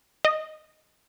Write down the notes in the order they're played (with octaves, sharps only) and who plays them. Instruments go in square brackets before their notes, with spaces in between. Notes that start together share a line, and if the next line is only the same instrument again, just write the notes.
[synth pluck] D#5